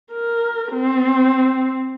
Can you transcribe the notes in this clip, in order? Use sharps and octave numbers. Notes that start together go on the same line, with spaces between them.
A#4
C4